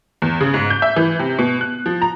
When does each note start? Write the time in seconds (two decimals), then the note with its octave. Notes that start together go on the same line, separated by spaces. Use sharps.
0.22 E2
0.41 C#3
0.54 G#2
0.70 G6
0.82 E5
0.96 E3
1.19 C3
1.39 B2
1.61 F#6
1.86 F3
2.02 A#5